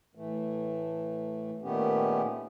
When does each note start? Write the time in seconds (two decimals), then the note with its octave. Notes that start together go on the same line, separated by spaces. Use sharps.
0.15 A2 E3 A3
1.62 A#2 D#3 A3 B3 C#4 G4